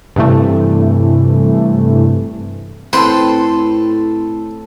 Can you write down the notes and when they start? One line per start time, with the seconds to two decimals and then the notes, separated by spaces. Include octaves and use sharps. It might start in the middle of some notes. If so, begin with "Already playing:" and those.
0.16 G2 C3 E3 A3
2.93 A2 C4 A4 B4 G5 C6